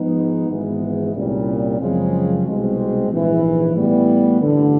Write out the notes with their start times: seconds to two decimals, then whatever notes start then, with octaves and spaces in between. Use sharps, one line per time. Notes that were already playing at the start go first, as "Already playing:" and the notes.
Already playing: G#2 F3 G#3 B3 D#4
0.49 G#1 G#2 E3 G#3 B3
1.14 C2 A#2 G3 A#3 C#4
1.80 F#2 C#3 F3 G#3 C4
2.45 C2 B2 G#3 C4
3.10 A#1 G#2 E3
3.76 A2 E3 G3 B3
4.41 A1 G2 D3